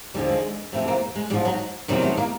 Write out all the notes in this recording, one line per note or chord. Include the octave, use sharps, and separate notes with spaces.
D#2 D3 F3 G3
G#3
F2 C3 E3 A3
A#3
G#3
G#2 F3 G3
F#3
E2 C3 D#3 F#3 G3
A3
A#3